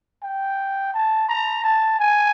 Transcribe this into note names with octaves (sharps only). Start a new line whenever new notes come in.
G5
A5
A#5
A5
G#5